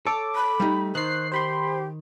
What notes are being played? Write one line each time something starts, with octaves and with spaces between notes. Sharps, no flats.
A4 C#5 D6
B5
G3 A3 D#4
D#3 C5 F#6 C7
G4 C5 B5 C6